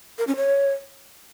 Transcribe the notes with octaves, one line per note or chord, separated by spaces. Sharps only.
A#4
C#4
C#5